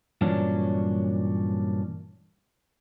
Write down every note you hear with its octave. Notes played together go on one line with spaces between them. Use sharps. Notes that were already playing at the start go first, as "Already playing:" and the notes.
G2 A#2 E3 F#3 C#4 D4